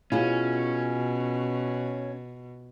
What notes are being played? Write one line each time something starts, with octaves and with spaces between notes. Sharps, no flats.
B2 C#4 E4 F4 G#4